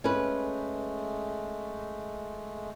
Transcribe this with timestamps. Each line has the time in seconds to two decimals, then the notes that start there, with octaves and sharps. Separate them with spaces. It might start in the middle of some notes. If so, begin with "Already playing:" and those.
0.04 G#3 A3 C#4 B4